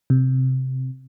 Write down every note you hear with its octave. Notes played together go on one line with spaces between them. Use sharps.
C3